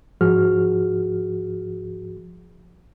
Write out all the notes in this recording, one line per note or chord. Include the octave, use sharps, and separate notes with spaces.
G#2 F3 F#4 G#4 F6